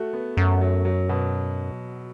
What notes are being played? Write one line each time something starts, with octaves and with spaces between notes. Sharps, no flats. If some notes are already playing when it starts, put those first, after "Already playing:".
Already playing: A3 F#4
B3
F#2 A3
F#3
F#3
B2